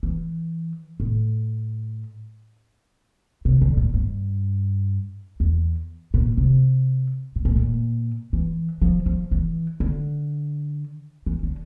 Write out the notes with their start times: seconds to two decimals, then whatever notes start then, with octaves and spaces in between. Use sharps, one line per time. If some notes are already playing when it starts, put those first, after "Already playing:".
0.03 E3
1.00 A2
3.45 C3
3.62 D3
3.77 A#2
3.94 G2
5.40 E2
6.14 A#2
6.37 C3
7.36 A#2
7.45 A2
7.56 A#2
8.33 E3
8.82 F3
9.06 F3
9.31 E3
9.80 D3
11.26 E3
11.43 D3